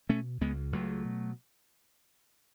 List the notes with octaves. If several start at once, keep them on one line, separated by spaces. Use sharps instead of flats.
B2 A3 C#4
C#2 G#3 B3
C#2 F#3 A3
B2